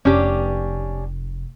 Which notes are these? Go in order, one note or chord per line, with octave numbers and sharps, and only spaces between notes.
F1 C#4 D4 G4